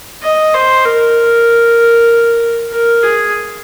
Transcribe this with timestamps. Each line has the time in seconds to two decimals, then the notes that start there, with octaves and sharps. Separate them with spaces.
0.23 D#5
0.54 C5
0.85 A#4
2.71 A#4
3.03 G#4